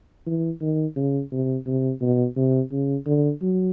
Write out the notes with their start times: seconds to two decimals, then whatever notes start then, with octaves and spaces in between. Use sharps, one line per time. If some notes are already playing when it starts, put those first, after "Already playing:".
0.26 E3
0.61 D#3
0.96 C#3
1.32 C3
1.67 C3
2.01 B2
2.36 C3
2.72 C#3
3.07 D3
3.42 F#3